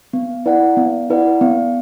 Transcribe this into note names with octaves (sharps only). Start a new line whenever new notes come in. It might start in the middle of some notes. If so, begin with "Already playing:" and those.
B3
E4 B4 D5 F#5
B3
E4 B4 D5 F#5
B3